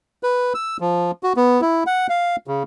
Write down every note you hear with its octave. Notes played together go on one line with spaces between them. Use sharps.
B4
E6
F3
F#4
B3
E4
F#5
F5
C#3